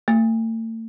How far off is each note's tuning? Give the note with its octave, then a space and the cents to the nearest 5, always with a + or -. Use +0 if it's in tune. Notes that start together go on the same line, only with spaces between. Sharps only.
A3 +40